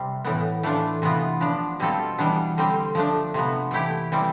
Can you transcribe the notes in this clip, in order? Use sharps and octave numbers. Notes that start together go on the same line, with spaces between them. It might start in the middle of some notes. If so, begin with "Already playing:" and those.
Already playing: C3 G3 C4
A2 E3 B3
E3 A3 D4 F4
C3 E3 B3 F4
F3 B3 D4
B2 G3 C4 F4 A4
E3 G3 B3 D4
D3 G3 C4
F3 A3 D4
C3 F3 B3
E3 A3 E4 G4
E3 G3 C4